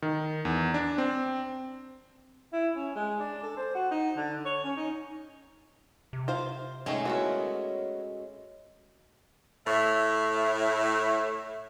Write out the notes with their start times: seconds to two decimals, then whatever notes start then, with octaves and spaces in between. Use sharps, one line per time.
0.02 D#3
0.45 E2
0.74 D4
0.98 C4
2.53 E4
2.76 C#4
2.95 G#3
3.20 D4
3.43 A4
3.57 C5
3.75 F#4
3.91 D#4
4.17 D3
4.45 C#5
4.64 C#4
4.77 D#4
6.13 C3
6.28 F4 C5 F5
6.86 D#3 G#3 A3 C#4 D#4 C#5
7.05 B3 E4 F#4 A#4 C#5
9.66 A2 C#5 E5